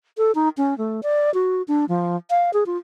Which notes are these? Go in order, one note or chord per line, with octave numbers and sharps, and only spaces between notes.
A4
D#4
C#4
A3
D5
F#4
D4
F3
F5
G#4
F4